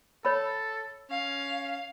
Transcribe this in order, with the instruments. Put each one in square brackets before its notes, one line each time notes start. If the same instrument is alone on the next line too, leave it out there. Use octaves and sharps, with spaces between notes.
[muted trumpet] A4 [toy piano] C#5 B5
[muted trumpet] C#4 [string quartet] F5